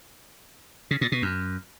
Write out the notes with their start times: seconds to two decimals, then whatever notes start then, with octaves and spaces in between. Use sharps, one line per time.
0.91 C#3
1.01 A#2
1.12 B2
1.22 F#2